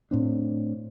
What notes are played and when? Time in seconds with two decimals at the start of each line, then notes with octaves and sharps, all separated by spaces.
0.11 A2 C4 D4